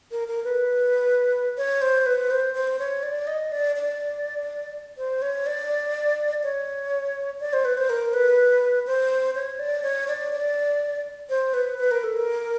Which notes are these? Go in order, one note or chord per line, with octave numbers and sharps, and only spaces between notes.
A#4
A#4
B4
C#5
C5
B4
C5
C5
C#5
D5
D#5
D5
D5
C5
C#5
D5
C#5
D5
C5
B4
C5
A#4
B4
C5
C#5
D5
C#5
D5
D5
C5
B4
B4
A#4
A4
A#4